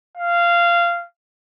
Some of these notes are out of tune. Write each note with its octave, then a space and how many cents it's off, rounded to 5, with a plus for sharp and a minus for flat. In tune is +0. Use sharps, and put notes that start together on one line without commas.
F5 -15